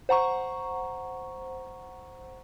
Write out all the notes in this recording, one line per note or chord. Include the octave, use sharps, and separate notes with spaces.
C5 F#5 A#5 C#6